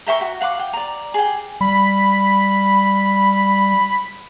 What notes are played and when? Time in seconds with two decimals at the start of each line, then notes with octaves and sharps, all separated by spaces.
0.07 A#4 E5 G5 C#6
0.21 F#4
0.40 F5 F#5 B5 D6
0.59 G5
0.73 D5 A#5
1.14 G#4 G5
1.61 G3 B5